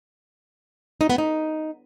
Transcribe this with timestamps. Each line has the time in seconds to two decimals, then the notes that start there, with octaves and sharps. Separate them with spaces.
1.01 D#4
1.09 B3
1.18 D#4